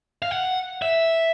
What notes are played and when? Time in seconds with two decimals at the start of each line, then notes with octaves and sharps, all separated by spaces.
0.22 F5
0.31 F#5
0.82 E5